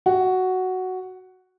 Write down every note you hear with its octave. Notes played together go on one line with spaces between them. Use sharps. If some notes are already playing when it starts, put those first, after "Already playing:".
F#4